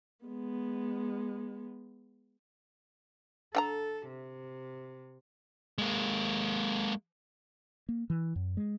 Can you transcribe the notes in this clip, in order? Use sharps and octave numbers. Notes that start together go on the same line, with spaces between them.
G#3 B3
D3 A4 G5 A#5
C3
G#3 A#3
A#3
E3
F#2
G#3